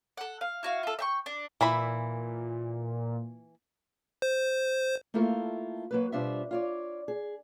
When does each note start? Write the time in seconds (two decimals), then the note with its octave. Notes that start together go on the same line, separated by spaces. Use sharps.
0.17 A4 F#5
0.41 F5
0.63 E4 F#4 F5
0.83 F4 A4
0.99 E5 G5 C#6
1.26 D4
1.61 A#2 E3 E4 B5
4.22 C5
5.14 A3 A#3 E4 F4 A4 A#4
5.91 F#3 A#3 B4
6.12 B2 G3 D4 F4 C5 E5
6.51 F4 C#5 D5
7.08 G#4